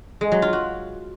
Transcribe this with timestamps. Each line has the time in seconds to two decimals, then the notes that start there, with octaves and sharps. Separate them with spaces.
0.21 G#3
0.32 F#3
0.42 F4
0.53 F#4